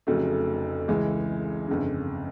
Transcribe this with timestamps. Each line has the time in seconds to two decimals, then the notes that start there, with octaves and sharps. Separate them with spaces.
0.07 F1 F2 C#3 F#3 A3
0.88 C#2 C#3 E3 G#3
1.68 G1 F2 C#3